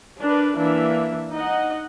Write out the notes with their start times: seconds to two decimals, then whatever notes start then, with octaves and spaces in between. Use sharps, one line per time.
0.21 D4 A#4 B4
0.56 E3 A#3 D4 E5
1.32 D#4 D#5 F#5